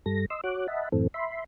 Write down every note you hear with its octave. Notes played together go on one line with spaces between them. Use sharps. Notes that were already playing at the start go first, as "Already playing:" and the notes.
G2 G3 A4 A#6
D#5 C6 E6
F#4 C#5 D6 F#6
D#5 E5 F#5 A5 B5
F#2 A2 E3 C4 A4
E5 B5 C6